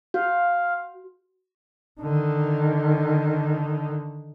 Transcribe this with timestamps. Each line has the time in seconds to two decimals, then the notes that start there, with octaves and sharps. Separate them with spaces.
0.14 F#4 F5
2.01 D3 D#3